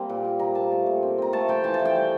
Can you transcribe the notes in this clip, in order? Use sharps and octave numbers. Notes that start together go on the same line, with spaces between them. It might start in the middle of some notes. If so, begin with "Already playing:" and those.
Already playing: G3 A#3 C4
A#2
A#2
G3 A#5
A#3 A5
A3
A#2
C4
C4 A#5
A3 A5
F3 G5
E3 A5
A5
E3
G5
G3